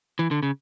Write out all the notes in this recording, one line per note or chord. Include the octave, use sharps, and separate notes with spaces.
E3
D3
C#3